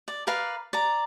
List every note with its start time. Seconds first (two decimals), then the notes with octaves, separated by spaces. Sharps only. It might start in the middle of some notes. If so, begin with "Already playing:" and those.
0.08 D5
0.27 A#4 B4 D5 F5
0.73 D5 A#5